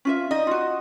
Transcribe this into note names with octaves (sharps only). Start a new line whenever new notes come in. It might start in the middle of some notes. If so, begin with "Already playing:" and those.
C#4 F4 E5
D#4 D#5
F4 F#4